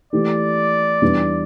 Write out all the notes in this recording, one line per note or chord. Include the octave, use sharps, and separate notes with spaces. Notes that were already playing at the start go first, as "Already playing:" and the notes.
E3 A3 G4 D5
E2 E3 G3 B3 D4